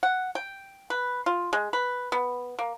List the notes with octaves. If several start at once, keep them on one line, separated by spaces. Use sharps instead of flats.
F#5
G5
B4
F4
G#3
B4
B3
A#3